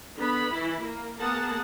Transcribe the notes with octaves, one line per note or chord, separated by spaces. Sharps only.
D3 B3 B5
E3 E4
A#3
A#3 B3 G#4 F#5 A5